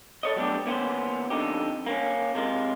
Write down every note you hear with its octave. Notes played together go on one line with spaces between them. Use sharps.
A4 C#5 D#5
F#3 G3 A3 B3 D4 G4
E2 A#3 B3 C#4 C5
F2 G#2 D3 D#4 G4
A#3 C4 C#4
C3 G#3 F4